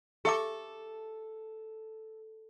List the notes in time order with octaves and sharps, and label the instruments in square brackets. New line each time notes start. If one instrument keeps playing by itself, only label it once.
[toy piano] G4 E5 D6 [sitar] A4